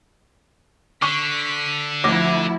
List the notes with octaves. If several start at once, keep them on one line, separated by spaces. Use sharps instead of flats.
D3 C#6 B6
D2 F3 E4 D6 A#6